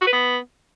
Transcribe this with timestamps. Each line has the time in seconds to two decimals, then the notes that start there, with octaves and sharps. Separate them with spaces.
0.01 F#4
0.07 B4
0.13 B3